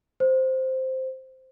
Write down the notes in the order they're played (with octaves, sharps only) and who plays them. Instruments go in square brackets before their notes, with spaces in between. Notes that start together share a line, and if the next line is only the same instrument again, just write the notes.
[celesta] C5